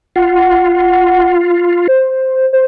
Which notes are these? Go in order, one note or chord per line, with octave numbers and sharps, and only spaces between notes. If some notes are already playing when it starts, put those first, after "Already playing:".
F4 F#5
C5
C5